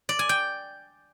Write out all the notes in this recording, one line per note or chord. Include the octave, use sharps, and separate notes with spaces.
D5
G#5
G5